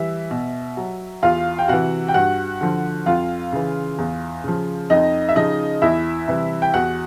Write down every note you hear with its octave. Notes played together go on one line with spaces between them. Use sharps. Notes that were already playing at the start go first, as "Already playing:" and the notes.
Already playing: E3 G3 E5
B2
F#3
E2 F4 F5
G5
C3 E3 F#4 F#5
G5
G2 F#4 F#5
D3 F3
F2 F4 F5
C#3 E3
E2
C#3 F3
F2 D#4 D#5
E5
C#3 F3 D#4 D#5
E2 E4 E5
C3 E3 G3
G5
E2 F#4 F#5